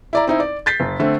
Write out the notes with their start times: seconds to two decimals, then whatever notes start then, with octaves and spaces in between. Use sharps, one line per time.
0.13 E4 D5 A#5
0.27 C4 D#4 E4
0.40 D5
0.66 G6 A6 B6 C7
0.80 F#1
1.00 D3 A3 C4